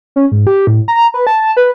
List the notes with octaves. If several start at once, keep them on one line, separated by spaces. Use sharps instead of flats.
C#4
G#2
G4
A2
A#5
B4
A5
B4